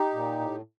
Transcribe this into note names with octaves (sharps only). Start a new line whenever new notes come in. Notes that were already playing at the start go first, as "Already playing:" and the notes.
Already playing: D#4 G4
A#2
A2